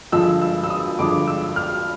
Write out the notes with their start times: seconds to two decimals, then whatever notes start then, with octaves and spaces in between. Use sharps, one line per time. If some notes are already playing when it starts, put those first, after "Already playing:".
0.12 G2 D3 F3 G#3 E6
0.42 E6
0.64 E6
0.70 D#6
0.99 G2 D3 F3 G#3 D6
1.27 E6
1.56 F6